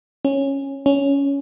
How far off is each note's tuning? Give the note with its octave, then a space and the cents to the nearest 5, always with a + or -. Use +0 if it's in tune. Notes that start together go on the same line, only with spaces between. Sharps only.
C#4 -10
C#4 +10